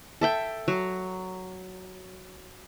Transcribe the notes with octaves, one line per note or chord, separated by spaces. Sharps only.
A4 E5 G5
F#3